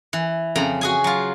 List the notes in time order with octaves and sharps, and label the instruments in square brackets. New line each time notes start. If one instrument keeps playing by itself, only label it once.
[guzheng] E3
F2 C#3 A#5
F#4 G#4 G#5
F#3 F4